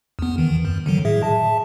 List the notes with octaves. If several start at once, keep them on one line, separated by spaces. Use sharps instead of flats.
E2 B3
D#3 E3
F#2
D3 D#3 F#3
A2 G#4 E5
E5 A5